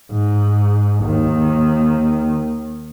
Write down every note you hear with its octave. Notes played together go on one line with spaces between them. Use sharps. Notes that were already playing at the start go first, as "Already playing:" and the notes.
G#2
D#2 D#3